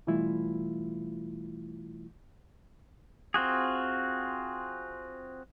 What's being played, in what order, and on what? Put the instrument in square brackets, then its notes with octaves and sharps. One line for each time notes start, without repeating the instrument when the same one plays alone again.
[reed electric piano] B2 E3 G3 A3 E4 F4
[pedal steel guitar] C4 F4 F#4 G#4